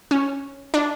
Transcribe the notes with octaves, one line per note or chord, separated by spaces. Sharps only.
C#4
D4